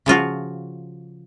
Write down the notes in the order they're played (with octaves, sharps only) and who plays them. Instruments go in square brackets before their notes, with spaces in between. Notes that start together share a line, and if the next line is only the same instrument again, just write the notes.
[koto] C#3 F3 F4 F#4